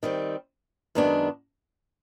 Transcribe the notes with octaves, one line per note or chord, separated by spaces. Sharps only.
D#3 G3 C4
F#2 D#3 G#3 B3 D4